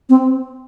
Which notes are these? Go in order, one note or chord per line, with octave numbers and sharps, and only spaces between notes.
C4